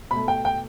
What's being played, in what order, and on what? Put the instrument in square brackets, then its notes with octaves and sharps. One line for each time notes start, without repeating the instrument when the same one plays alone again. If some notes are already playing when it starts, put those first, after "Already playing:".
[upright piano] B2 A3 B5
G5
G5